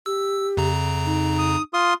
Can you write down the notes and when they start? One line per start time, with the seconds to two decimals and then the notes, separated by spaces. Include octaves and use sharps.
0.06 G4 E6
0.57 F2 C#3 A#5
1.06 D#4
1.39 D#6
1.74 F4 C6 D#6